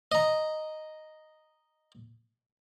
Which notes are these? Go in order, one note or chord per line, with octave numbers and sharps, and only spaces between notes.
D#5 A#5